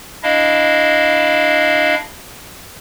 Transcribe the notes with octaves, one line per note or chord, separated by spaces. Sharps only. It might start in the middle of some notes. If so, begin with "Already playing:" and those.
D4 E4 D#5 F5